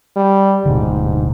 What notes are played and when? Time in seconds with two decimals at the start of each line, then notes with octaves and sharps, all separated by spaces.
0.16 G3
0.65 D1 G#2 B2 D3